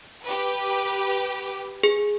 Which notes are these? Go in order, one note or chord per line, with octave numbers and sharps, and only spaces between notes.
G4 B4
G#4